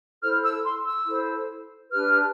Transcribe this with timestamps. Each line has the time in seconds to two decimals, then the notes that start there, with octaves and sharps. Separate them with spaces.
0.22 E4 A4 C5 F6
0.43 E6
0.64 C6
0.85 E6
1.06 E4 A4 C5
1.90 D4 G4 B4 F6